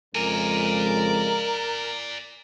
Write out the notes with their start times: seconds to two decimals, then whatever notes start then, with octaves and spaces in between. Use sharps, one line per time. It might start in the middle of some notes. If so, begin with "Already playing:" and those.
0.15 F2 C#3 G#3 A#4 D5 G#5